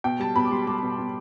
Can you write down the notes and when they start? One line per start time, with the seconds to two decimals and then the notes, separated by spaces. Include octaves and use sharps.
0.04 B2 G5
0.20 G3 A5
0.36 B2 B5
0.45 D6
0.51 G3 C6
0.67 G3 D6
0.83 B2
0.99 B2